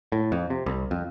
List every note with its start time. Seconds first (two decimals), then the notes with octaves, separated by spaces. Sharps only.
0.12 A2
0.32 F2
0.50 C3
0.66 C2
0.91 F2